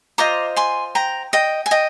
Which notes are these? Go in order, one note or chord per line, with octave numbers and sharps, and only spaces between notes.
F4 C5 D#5 A#5 D6
G#5 C6
G5 A#5
D#5 G5
G#5
D#5 G5